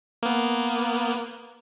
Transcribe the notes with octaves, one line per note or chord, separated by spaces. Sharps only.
A#3 B3